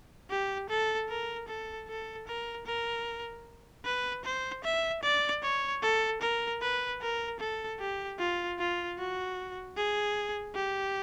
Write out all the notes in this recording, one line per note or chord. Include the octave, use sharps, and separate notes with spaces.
G4
A4
A#4
A4
A4
A#4
A#4
B4
C5
E5
D5
C#5
A4
A#4
B4
A#4
A4
G4
F4
F4
F#4
G#4
G4